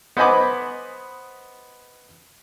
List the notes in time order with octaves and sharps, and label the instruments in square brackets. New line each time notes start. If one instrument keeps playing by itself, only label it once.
[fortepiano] B3 C5 D#5 G#5 B5 D6